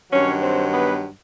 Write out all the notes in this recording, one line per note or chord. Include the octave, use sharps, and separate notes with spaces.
G2 D#3 F#3 C#4 C#5
C4 C5
B3 B4